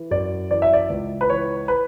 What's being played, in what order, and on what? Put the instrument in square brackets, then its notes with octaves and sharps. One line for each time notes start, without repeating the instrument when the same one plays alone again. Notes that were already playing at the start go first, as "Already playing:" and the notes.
Already playing: [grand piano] E3
F#2 D5
E3 D5
E5
D5
C#2
B4
E3 C#5
B4